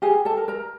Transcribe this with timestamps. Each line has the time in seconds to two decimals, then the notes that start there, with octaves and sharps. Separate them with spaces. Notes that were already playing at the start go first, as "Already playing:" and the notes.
0.02 G4 G#4 G#5
0.25 A4 A5
0.37 A#4
0.48 A#4 A#5